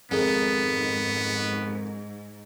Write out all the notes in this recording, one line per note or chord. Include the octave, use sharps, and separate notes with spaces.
F2 G#2 D#3 G#3 B3